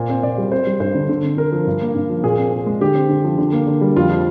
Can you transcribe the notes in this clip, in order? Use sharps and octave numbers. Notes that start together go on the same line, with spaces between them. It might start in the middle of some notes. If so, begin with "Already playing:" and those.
Already playing: A#2 C5
C4
A#2 D5
G3
C4 C5
G3
G2 C5
D3
D3
C4
D3 A#4
F3
G2
A#3
G2
F3
A#2 G#4
C4
A#2
G#3
D3 G4
C4
D3
F3
D3
A#3
D3
G3
F2 F4
F3